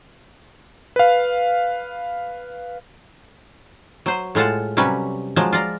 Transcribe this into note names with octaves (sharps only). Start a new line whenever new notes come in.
B4 F5
F#3 C5
A2 G#3 F4 F#5 A5
C3 F#3 G3 C#4 B4
F3 F#3 G#3
F4 D5 A#5